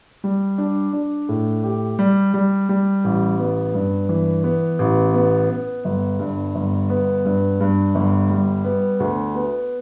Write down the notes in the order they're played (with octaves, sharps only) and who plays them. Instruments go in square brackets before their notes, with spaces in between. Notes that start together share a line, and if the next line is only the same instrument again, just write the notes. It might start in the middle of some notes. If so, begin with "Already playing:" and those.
[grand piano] G3
D4
D4
A2
G4
G3
G3
G3
A1
B3
G2
E3
B3
A1
B3
B3
G1
G2
G1
B3
G2
G2
G1
G3
B3
D2
B3